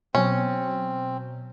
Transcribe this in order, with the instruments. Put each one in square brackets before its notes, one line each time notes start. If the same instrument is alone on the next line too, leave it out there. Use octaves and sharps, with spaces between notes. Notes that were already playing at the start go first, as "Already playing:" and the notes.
[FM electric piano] B2 F#3 [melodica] C4 [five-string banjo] C#4